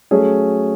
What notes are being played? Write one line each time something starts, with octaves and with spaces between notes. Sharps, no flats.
F#3 A3 C#4 G#4